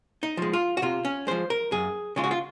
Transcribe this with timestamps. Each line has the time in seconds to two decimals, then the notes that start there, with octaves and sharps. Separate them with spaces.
0.23 D#4
0.37 F3 G#3
0.53 F4
0.77 F#4
0.82 C3 F4
1.05 C#4
1.27 F3 G#3 C5
1.50 A#4
1.72 F#2 G#4
2.16 C#3 G#3 F4
2.24 F#4
2.31 F4